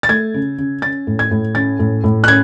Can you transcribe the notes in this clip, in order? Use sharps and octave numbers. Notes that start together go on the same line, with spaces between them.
A6
A3 G#6
C#3
C#3
C#4 A6
A2
G#6
A2
C#4 A6
A2
A2
F#6
C#4 G#6